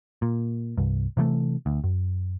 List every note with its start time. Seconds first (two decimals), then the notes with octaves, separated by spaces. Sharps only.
0.22 A#2
0.78 C2 G2
1.17 C3 E3 G3 A3
1.66 D2
1.84 F#2